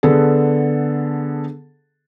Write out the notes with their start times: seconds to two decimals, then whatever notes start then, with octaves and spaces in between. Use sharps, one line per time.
0.03 D3 B3 G#4 A4